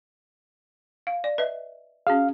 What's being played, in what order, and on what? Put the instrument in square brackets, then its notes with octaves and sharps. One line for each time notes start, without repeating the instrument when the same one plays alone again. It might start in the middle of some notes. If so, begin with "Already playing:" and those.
[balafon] F5
D5
B4 D#5 E5
[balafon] C#4 F#4 G#4 [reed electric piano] F5